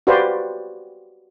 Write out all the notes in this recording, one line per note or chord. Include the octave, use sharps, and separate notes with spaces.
F#4 G4 B4 C5 D5 F5